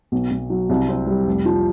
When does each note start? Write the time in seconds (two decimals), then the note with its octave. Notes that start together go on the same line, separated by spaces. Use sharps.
0.12 B1
0.31 B1
0.50 F#3
0.69 C2
0.89 C4
1.07 G3
1.27 F1
1.45 F3